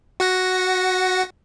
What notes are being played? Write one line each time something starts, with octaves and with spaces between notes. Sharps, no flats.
F#4 F#5 A#6